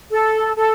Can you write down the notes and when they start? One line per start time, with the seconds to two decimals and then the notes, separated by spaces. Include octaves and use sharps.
0.10 A4
0.56 A4